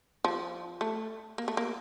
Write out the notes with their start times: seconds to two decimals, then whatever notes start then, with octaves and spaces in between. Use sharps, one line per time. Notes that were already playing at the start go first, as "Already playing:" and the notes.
0.24 F3
0.81 A3
1.38 A#3
1.48 A3
1.57 A#3